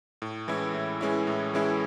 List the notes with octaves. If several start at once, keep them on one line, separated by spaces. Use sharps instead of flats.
A2
E3 G#3 C#4 E4
A2
E3 G#3 C#4 E4
A2
E3 G#3 C#4 E4